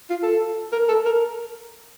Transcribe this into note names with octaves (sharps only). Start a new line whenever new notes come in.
F4
A4
A#4
A4
A#4